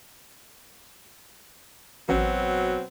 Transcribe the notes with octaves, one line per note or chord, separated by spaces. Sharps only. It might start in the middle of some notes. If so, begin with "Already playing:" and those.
A1 B2 F#3 C4